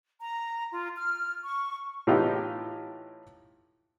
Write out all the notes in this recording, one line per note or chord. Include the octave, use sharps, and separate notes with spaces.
A#5
F4
F6
C#6
A2 E3 D#4 F4 G4